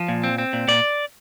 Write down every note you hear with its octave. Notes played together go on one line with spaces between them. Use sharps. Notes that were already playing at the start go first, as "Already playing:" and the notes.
Already playing: F3
A#2
C4
C4
A#2
A#2 D5